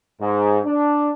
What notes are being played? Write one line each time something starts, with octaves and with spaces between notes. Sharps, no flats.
G#2
D4